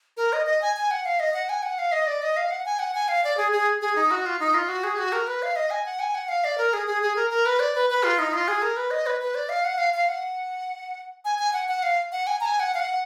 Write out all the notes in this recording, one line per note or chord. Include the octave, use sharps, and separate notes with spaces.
A#4
D#5
D#5
G#5
G#5
F#5
F5
D#5
F#5
G#5
F#5
F5
D#5
D5
D#5
F5
F#5
G#5
F#5
G#5
F5
D5
G#4
G#4
G#4
D#4
F#4
F4
D#4
F4
F#4
G#4
F#4
A#4
B4
F5
D#5
G#5
F#5
G#5
F#5
F5
D5
A#4
G#4
G#4
G#4
A#4
A#4
B4
D5
B4
B4
F4
D#4
F4
G#4
A#4
B4
D#5
B4
B4
D5
F5
F#5
F5
F5
F#5
G#5
G#5
F#5
F#5
F5
F#5
G#5
A#5
G#5
F#5
F5
F#5